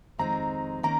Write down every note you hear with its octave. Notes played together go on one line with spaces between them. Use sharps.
F2 D#3 G#3 C4 D#4 A#5
D#3 A#3 C#4 A#5